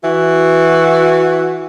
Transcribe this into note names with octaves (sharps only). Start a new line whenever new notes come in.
E3 F#4